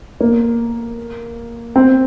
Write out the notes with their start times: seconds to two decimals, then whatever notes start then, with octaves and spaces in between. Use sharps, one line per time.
0.21 A#3
1.76 C4